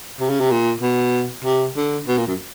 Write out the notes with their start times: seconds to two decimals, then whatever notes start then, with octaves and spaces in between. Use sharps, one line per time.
0.20 C3
0.30 C#3
0.40 C3
0.51 A#2
0.81 B2
1.44 C3
1.76 D3
2.07 B2
2.17 A#2
2.27 F#2